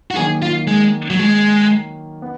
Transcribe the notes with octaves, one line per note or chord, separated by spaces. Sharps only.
F#4
D#3 F#3 A#3 G#4
F4
G#3
F#3
G#3
B3